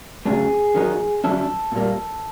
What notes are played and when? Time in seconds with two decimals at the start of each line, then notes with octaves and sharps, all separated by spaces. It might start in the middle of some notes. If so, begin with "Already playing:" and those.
0.25 F#2 C#3 F#3 A3 G#4
0.75 D#3 F#3 A#3 D#4
1.24 D3 F#3 A#3 C#4 E4 A4
1.72 A#2 G3 A#3